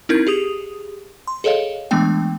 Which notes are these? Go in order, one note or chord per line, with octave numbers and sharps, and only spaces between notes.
C4 D#4 E4 A#4 G6 G#6
G4 G#4 D#6 F7
C6
G#4 A4 C#5 D#5 F5
E3 G#3 A3 B3 D4 G5